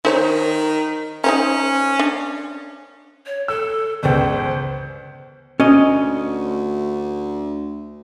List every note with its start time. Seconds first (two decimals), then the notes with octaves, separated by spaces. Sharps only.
0.05 D#3 D#4 C5 C#5
1.24 C#4 D#4 C5 A#5
1.99 D4
3.26 C#5
3.48 A4 E6
4.03 G1 C#2 C5
5.60 D2 C#4 D#5